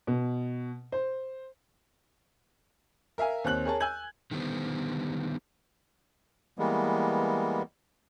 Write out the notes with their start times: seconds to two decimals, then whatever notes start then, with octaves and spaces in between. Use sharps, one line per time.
0.07 B2
0.92 C5
3.18 A#4 E5 F5 G#5
3.44 D#2 C4 C#5 F#6 F#7
3.65 G#4 A#4 C#5 A5
3.80 G#5 E6 G6 G#6 F#7
4.31 D3 D#3 G3 B3 C5
6.59 E3 G3 G#3 A#3 B3